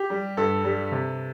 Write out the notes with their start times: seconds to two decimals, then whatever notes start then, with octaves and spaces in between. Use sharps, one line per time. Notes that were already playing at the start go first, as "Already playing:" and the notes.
Already playing: G4
0.10 G3
0.37 G2 A4
0.64 G3
0.92 C3